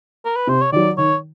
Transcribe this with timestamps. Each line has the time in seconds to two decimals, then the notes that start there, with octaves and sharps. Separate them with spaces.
0.25 A#4
0.36 B4
0.47 C3 C5
0.61 C#5
0.72 D#3 F#3 D5
0.98 D#3 C#5